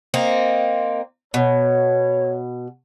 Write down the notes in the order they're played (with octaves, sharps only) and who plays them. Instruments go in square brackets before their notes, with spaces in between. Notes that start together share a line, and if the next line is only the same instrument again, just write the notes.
[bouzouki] A#3 C4 D#4
[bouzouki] B2 [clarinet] C#5